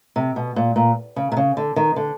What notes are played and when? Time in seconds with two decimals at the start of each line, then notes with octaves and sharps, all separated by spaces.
0.16 C3
0.36 B2
0.56 A#2
0.76 A#2
1.16 C#3
1.32 C3
1.37 C#3
1.57 D3
1.76 D#3
1.96 D3